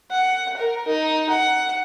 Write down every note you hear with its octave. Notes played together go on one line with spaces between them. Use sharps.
F#5
A#4
D#4
F#5